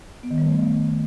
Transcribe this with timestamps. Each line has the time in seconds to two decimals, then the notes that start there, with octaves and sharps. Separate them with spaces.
0.23 B3
0.31 D#3
0.38 G3
0.45 A3
0.53 B3